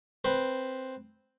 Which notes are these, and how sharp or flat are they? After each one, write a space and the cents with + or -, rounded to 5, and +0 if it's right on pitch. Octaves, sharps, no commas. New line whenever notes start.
C4 +0 B4 +0